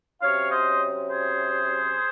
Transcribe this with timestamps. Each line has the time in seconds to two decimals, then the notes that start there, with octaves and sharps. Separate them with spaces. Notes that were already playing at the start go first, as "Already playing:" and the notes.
0.21 C3 F#3 C#4 C#5 F5
0.50 C5 D#5
1.10 G#4 C5